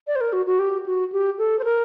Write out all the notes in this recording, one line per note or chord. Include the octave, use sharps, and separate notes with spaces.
D5
C5
A#4
F#4
F#4
G4
F#4
G4
A4
C5
A#4